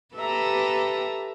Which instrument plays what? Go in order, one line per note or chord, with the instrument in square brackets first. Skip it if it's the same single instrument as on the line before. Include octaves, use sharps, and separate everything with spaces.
[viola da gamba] G4 A4 B4 [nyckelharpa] E5 A#5